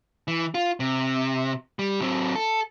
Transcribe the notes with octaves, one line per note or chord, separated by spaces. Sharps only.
E3
F4
C3
G3
F#3 C4
A4